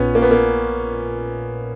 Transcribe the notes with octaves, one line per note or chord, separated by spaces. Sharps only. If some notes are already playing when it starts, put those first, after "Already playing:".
Already playing: A#1 A#2 B3 C#4 F4
A#3
B3
A#3